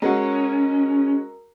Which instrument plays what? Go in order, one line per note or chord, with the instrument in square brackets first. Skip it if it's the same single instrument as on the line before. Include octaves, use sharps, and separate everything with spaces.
[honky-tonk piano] G#3 F#4 [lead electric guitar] C#4 [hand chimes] A#4 A#5